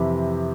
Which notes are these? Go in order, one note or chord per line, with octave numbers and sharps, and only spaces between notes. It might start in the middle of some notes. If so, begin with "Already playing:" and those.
Already playing: F2 C3 E3 B5 D6